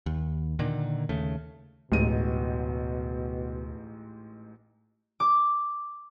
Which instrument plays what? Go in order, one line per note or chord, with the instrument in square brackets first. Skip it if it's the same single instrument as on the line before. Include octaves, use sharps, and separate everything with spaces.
[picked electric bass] D#2
A#2 D3 D#3
D#2 C#3 A3
[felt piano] A1 G#2 D#7 [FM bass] D2 [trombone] B2
[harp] D6